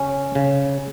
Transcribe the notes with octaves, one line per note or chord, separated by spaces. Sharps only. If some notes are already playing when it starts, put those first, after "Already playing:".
Already playing: C#3 C#4
C#3